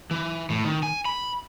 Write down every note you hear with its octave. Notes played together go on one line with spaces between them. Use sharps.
E3
A2
D#3
G#5
B5